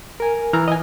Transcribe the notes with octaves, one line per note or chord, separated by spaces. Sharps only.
A#4 G#5
E3 A#5 F6
D#5 G#5